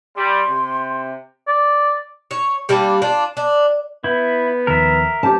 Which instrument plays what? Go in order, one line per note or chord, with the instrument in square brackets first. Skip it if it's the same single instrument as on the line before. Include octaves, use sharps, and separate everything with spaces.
[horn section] G3 [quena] C6
[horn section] C3
[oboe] D5
[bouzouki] C#5
G3 A#3 D4
D4 F4
D4
[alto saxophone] B3 [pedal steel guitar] E4 [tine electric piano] G6
[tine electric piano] D#2 D#3 F3 [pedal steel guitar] A#4 E5
[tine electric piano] F#3 [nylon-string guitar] G4 C5 A5